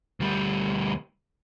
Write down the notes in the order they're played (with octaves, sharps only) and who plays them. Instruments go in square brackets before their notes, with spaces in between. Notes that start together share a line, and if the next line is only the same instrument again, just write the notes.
[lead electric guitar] D2 G3